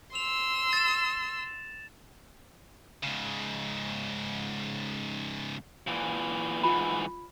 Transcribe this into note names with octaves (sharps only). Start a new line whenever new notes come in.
C6 E6 F7
A6 E7
G#2 C#3
A#2 E3
G#2 E3 F4 B5